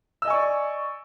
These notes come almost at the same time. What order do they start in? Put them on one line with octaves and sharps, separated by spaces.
E6 D#5 G#5 C#6 D5